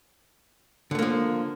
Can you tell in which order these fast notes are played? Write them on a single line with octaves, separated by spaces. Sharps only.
D3 A3 A#3 F3